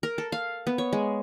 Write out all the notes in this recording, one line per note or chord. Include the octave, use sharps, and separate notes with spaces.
A#4
A4
F5
B3
C#5
G#3